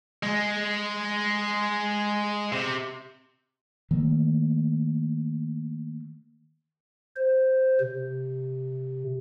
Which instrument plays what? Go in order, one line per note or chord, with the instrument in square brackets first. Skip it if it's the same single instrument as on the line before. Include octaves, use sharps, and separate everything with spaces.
[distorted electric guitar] G#3
C3
[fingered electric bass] D#3 A3 A#3
[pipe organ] C5
C3